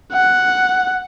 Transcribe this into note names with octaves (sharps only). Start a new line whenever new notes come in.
F#5